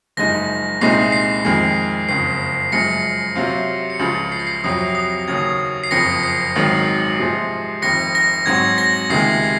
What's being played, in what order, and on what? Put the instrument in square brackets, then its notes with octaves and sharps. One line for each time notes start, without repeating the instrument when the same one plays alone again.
[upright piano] F#1 F#2 F3 G#3 D#4 [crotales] A#6
[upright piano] C2 A#2 G#3 C4 D#4 [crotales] C7
[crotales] C7
[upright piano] F2 D#3 G#3
[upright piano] F#1 F2 C#3 [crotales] C7
[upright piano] F#2 C#3 F3 G#3 [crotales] A#6 C#7
[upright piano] C3 F#3 C4 F4
[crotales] C#7
[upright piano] C#2 C#3 F3 [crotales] C7
[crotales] C7
A#6
C7
[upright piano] F2 C3 F#3 [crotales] D#6
[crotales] D#6
[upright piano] D#2 C#3 F#3 C#4 [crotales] G#6
[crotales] C7
[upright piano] F#1 F2 C#3 F3 [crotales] A#6 C#7
[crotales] C7
[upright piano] G#1 G#2 D#3 F#3
C3 F3 G#3 C4
[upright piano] F1 F2 D#3 [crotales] A#6 C#7
[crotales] A#6
[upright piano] G#2 F#3 C4 F#4 [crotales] G#6
[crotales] A#6
[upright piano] C#2 C3 D#3 G#3 [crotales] C7